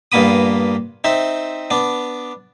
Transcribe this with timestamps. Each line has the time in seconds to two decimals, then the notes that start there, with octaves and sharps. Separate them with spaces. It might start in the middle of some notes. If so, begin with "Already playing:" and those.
0.12 G2 A#2 A#3 B3 B5 D#6
1.04 C4 D#4 E5
1.71 B3 D4